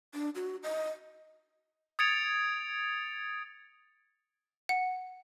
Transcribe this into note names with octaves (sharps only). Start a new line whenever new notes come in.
D4
F#4
D#5
D#6 G#6 A6 C#7 D7 F7
F#5